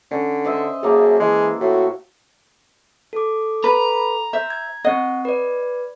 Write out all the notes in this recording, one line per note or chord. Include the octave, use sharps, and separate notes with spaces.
D3 C#4
C5 D#5 E5
F#2 A#3 G#4 A4
E3 G#3
A2 F#4
A4 D6
B4 A#5
C5 E5
G#6
C4 D#5 F#5
B4 D5